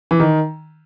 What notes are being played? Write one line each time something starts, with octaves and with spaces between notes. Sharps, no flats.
E3
D#3